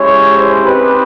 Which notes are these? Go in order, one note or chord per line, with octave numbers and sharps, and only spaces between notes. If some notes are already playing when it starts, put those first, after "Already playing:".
Already playing: G#3 C#4 E4 G4 C#5
C5
C4 D#4 G4 B4